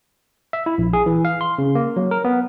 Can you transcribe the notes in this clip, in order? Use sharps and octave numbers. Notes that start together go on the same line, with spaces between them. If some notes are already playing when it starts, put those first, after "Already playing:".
E5
E4
A#1
G#4
E3
F5
C6
C#3
A#3
F#3
A#4
B3